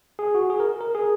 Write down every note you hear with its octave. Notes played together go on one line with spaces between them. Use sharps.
G#4
F#4
G#4
A#4
A#4
G#4